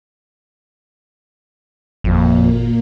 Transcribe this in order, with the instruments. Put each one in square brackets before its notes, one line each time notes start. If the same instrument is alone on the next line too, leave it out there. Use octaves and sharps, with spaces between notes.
[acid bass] G#1 [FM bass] F2 [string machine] A#2 A#3